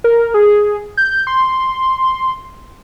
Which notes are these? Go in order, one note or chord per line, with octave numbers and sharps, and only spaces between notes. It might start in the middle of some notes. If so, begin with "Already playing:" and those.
A#4
G#4
G6
C6